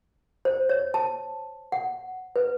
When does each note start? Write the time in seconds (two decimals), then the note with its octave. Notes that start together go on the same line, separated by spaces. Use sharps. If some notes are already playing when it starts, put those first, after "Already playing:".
0.45 C5
0.69 C#5
0.94 A5
1.72 F#5
2.36 B4